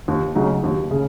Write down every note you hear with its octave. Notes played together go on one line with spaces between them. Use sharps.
D#2
C#3 F#3 D#4
D#2
C#3